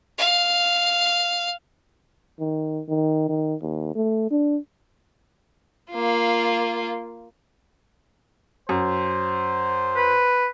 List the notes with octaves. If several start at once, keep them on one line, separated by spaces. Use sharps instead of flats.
F5
D#3
D#3
D#3
D#2
A3
D4
A#3 F4
F#2 C5
B4